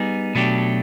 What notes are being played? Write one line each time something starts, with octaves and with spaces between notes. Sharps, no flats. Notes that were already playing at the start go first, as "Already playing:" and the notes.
Already playing: G3 B3 D#4 G#4
B2 F#3 A3 D4 G4